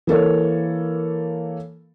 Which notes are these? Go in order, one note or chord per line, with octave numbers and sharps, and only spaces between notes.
E3 A#3 A4 C#5